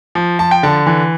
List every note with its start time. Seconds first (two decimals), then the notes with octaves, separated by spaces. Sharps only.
0.15 F3
0.39 F3 A5
0.51 G5
0.63 D3 A5
0.87 E3